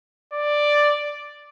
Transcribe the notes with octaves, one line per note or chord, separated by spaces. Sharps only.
D5